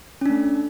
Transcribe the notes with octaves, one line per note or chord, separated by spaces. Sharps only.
A3 C#4 D4